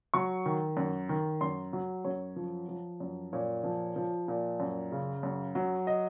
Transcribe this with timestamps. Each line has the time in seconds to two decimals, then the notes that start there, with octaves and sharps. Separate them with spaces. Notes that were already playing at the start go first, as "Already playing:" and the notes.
0.14 F#3 C#6
0.46 D#3
0.77 F#2
1.09 D#3
1.41 F#2 C6
1.73 F#3
2.05 F#2 C#5
2.36 F3
2.68 F3
3.00 F#2
3.33 A#2 C#5
3.64 F3
3.96 F3
4.28 A#2
4.60 F#2
4.92 C#3
5.23 F#2
5.55 F#3
5.87 D#5